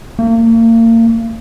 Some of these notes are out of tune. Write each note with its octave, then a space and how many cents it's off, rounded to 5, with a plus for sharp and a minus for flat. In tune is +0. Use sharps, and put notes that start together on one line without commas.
A#3 -35